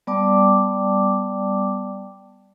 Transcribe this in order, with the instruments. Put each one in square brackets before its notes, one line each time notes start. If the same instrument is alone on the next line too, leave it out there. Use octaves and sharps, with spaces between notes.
[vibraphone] G3 B3 D5 G5 A5 D6